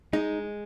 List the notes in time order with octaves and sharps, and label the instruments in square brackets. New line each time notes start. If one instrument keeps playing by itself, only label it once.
[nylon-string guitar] G#3 [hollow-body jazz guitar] D#4